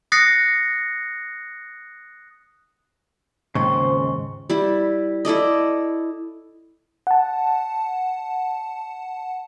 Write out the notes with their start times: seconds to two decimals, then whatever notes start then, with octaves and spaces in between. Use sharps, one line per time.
0.12 D#6 F#6 A6 A#6 C7 C#7
3.55 D#2 G#2 C#3 F3 C4 C6 C#6
4.49 G3 E4
5.25 E4 A4 D5 D#5
7.07 F#5 A5